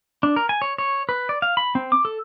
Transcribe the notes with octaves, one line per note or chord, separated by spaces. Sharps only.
D4
A#4
G#5
C#5
C#5
B4
D5
F5
B5
C4
D6
A4